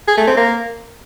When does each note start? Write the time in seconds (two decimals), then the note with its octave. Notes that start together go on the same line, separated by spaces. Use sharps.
0.08 G#4
0.17 A3
0.27 C4
0.37 A#3